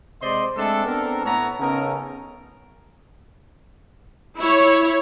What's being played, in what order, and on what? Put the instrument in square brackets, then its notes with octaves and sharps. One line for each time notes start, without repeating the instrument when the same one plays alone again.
[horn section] C3 G#3 C5 D5 D#5 C6
G#3 A3 C4 D4 A4
B3 C4 D4 A4 A#4
A2 A3 B3 A4 C#5 A#5
C#3 B3 C#4 D#4 A4 A#4
[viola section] E4 C#5